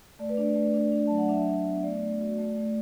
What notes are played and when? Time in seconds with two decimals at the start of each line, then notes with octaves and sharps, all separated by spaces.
0.19 A3 D5
0.29 B4
0.37 D4 D5
0.55 A3
0.74 D4
0.92 D4
1.07 F#3 A5
1.18 F#5
1.29 D4 E5
1.47 D4
1.65 B3
1.83 A3 D5
2.02 A3
2.19 F#4
2.38 A3
2.56 A3